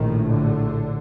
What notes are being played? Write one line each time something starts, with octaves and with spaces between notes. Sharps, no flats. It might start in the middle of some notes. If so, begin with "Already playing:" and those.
Already playing: A#1 A2 D#3
D3